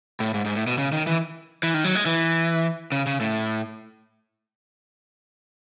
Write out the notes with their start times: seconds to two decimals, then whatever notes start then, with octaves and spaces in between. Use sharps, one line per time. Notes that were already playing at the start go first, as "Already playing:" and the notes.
0.20 A2
0.34 G#2
0.46 G#2
0.55 A2
0.67 B2
0.78 C#3
0.92 D#3
1.07 E3
1.63 E3
1.74 D#3
1.84 F#3
1.95 G#3
2.06 E3
2.92 C#3
3.07 C#3
3.21 A2